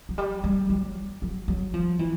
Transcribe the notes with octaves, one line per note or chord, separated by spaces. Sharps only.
F#3
G3
G3
F#3
F#3
F#3
F3
E3